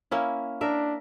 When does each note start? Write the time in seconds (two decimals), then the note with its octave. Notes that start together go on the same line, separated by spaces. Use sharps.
0.11 A#3 C#4 E4
0.61 D4 A#4 E5